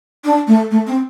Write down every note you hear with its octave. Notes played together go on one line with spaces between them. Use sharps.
D4
A3
A3
C4